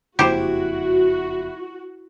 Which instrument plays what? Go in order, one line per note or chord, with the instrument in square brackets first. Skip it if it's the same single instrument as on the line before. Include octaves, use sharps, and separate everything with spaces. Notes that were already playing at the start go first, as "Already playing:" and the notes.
[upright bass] F#1 F2 [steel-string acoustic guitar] E4 [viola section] F#4 [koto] G4 C5